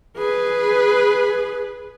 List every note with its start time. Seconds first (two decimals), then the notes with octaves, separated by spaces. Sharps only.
0.17 G#4 B4